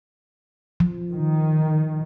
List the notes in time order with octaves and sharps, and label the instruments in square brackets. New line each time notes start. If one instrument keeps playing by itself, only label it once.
[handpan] F3
[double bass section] D#3